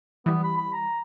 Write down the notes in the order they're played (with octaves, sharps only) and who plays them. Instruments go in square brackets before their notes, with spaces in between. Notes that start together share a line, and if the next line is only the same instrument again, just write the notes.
[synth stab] E3 G3 [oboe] B3
[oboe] B5
B5
A#5